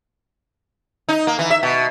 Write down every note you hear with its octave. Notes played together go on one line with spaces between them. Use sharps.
D#4
A#3
E3
E5
B2